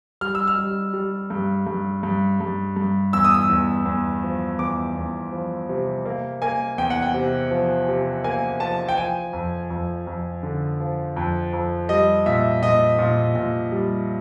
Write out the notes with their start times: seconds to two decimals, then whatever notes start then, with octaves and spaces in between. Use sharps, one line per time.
0.21 G3 F6
0.35 E6
0.48 F6
0.58 G3
0.94 G3
1.30 G2
1.67 G2
2.03 G2
2.40 G2
2.76 G2
3.13 E2 E6
3.24 D#6
3.34 E6
3.49 E2
3.86 E2
4.23 F3
4.59 E2 D6
4.96 E2
5.32 F3
5.69 C3
6.06 A#3
6.42 A#3 G#5
6.78 E2 G5
6.90 F#5
7.02 G5
7.14 C3
7.51 F3
7.88 C3
8.24 A#3 G#5
8.60 F3 A5
8.89 G5
8.97 F3 G#5
9.33 F2
9.70 F2
10.07 F2
10.43 D3
10.80 F3
11.16 F2
11.53 F2
11.89 G3 D#5
12.26 A#2 E5
12.62 A#2 D#5
12.99 A#2
13.35 A#2
13.72 G3